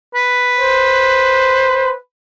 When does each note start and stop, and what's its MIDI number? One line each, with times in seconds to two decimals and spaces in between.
0.15 1.96 71
0.59 1.94 72